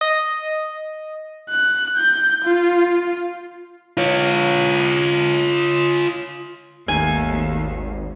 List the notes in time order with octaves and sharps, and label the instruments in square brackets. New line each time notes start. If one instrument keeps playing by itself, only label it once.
[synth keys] D#5
[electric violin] F#6
G6
F4
[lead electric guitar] F4 C#5
[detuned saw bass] G#1 [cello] D#2 [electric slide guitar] D#3 A3 [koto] G#5